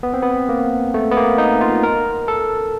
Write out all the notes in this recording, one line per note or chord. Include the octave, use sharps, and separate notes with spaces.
B3
C4
B3
A#3
A3
B3
A#3
D#4
F4
A#4
A4